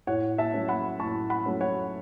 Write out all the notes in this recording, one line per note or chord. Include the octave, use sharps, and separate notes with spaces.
A2 C#5 F#5
E5 A5
F#3 A3 C#4
F#5 B5
A2 A5 C#6
F#5 B5
F#3 A3 C#4
C#5 F#5